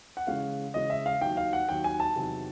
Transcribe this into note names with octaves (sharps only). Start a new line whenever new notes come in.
F#5
C#3 E3 G#3 C#4 F5
C#3 E3 G#3 C#4 D#5
E5
F5
D#2 D#3 F#3 G5
F5
F#5
D#2 D#3 F#3 G5
G#5
A5
E2 C3 D#3 F#3